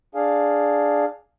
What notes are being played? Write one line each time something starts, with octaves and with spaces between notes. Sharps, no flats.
D4 G#4 F5